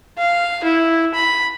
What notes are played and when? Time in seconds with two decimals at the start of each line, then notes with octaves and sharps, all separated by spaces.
0.18 F5
0.64 E4
1.14 B5